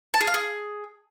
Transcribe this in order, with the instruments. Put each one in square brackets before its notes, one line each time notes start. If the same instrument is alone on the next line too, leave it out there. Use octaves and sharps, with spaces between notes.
[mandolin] A5
G#4
F5
G#4